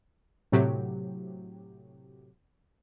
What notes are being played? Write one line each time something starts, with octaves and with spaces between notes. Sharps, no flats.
A2 C3 F#3 G4